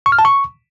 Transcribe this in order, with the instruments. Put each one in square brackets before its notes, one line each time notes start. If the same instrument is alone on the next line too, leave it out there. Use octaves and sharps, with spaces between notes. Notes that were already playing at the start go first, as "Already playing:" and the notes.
[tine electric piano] C#6
F6
A5
C#6